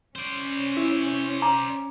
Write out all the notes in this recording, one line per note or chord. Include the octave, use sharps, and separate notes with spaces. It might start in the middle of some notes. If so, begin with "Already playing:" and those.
C#4 C5 D5
E4
A#5 D6